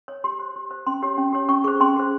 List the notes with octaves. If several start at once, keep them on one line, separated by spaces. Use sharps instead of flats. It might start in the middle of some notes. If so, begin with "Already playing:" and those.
C#5
G4 C6
C5
G4
C5
C#4 C6
G4 C#5
C#4
G4 C#5
C#4 C#6
G#4 C5 C#6
C#4 C6
G#4 C5